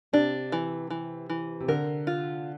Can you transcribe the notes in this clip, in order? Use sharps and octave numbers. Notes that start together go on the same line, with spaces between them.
C3 D4
E3
E3
E3
C3
D3 A#4
F4